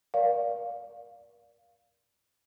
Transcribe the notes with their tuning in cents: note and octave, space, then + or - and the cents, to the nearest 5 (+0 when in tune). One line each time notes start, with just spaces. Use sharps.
A#4 +30 D5 -15 F5 +0